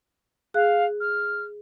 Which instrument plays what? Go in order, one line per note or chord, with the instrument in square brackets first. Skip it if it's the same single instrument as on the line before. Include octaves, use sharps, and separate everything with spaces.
[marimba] G#4 F#6 [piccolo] F5
[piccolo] F6